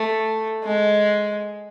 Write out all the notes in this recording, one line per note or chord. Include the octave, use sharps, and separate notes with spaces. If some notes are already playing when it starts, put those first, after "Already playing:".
Already playing: A3
G#3